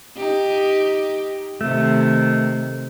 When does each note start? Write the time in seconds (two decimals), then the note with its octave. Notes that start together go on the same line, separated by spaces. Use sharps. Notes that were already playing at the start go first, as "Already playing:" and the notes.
0.17 D#4 G4
1.61 C3 D#3 A3